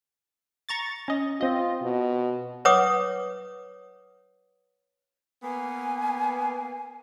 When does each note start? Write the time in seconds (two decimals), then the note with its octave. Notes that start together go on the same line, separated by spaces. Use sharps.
0.69 A#5 C#6 A6
1.08 C#4 D#5
1.41 C4 F4 D#5
1.82 B2
2.65 B4 C#5 F#5 D6 D#6
5.43 A#3 B3 G#5